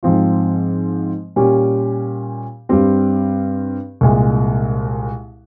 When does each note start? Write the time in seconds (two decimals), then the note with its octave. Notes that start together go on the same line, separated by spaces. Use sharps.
0.03 G#2 F3 C4 F4
1.36 A#2 G3 C#4 G4
2.69 G2 G3 C4 G4
4.01 C2 A#2 G#3